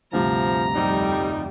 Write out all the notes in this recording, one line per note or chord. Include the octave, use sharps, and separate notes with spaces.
D2 G2 C3 F3 A#5
F2 G3 D#4